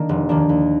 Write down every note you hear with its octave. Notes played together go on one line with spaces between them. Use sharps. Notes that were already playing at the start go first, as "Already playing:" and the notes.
Already playing: D#3 A#3 D4
F1
D#2 D#3 A#3 D4
D#2